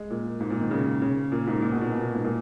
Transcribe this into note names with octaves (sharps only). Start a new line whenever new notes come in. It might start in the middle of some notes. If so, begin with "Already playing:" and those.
Already playing: G#3
A#2
G#2
A#2
D#3
C#3
C#3
A#2
G#2
A#2
B2
A#2
B2
A#2
G#2
A#2